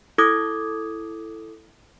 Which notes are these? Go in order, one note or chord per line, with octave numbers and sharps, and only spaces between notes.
E4 A4 D6 D#6 G#6